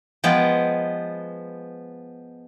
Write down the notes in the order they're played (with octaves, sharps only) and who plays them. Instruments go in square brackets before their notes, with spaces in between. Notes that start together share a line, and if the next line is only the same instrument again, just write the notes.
[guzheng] F3 G#3 B3 G5